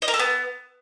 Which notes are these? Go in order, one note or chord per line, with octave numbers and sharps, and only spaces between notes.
D#5
A#4
A4
B3